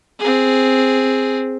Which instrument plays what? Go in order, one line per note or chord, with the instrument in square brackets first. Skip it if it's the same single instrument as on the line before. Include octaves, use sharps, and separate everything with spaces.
[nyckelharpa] C4 G#4